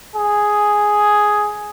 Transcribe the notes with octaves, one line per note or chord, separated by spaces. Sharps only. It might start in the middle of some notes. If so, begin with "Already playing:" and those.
G#4